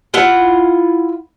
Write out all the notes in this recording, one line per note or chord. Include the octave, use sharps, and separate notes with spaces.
E4 F4 F#5